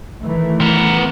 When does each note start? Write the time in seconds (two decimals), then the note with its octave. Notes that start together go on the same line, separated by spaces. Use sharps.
0.22 D#3 E3 A3
0.61 B3 A#4